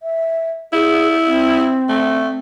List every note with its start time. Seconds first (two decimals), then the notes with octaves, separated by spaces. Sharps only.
0.02 E5
0.73 E4 G#4
1.27 C4
1.89 A3